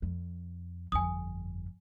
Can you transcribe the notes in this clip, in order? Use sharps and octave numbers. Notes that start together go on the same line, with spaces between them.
F2
G1 F2 G#5 D#6